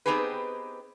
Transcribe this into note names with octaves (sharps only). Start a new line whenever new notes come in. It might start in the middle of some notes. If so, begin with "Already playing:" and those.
B3 C4 D#4 G4 G#4 B4